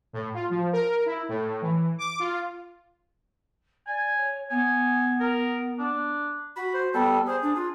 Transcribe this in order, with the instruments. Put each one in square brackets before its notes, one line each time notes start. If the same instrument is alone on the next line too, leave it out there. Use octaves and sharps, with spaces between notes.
[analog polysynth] A2
F4
F3
A#4
E4
A2
E3
D6
F4
[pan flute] D5 [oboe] G#5
[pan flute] C#5
[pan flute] B3 [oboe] G#5
[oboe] A#4
D4
[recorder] F#4 [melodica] B5
[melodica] C5
[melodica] G3 A4 [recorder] B3
[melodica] G#4 [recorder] C5
[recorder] D4
F4